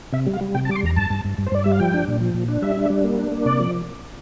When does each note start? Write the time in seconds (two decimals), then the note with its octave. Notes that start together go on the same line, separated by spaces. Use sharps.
0.13 C3 E5
0.26 G3
0.33 F5
0.41 G3
0.55 C3 G5
0.65 A5
0.69 G3 D6
0.75 C6
0.83 E2 A#5
0.96 G2 A5
1.10 G2
1.25 G2
1.38 G2
1.46 C5
1.52 G2 D5
1.64 G3 E5
1.71 F5
1.80 F3 G5
1.94 D4
2.08 A#2
2.21 F3
2.34 A#2
2.48 D4
2.62 G3 E5
2.77 D4
2.90 G3
3.04 A#3
3.19 D4
3.32 A#3
3.46 C3 D5
3.60 F3